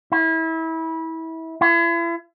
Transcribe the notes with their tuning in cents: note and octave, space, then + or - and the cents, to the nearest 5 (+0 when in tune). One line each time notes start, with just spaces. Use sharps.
E4 -25
E4 +40